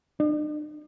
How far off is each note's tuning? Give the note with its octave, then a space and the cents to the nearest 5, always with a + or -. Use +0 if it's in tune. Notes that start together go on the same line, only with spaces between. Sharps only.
D4 +45